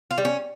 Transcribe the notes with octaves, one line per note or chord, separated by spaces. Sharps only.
F4
G3
C#4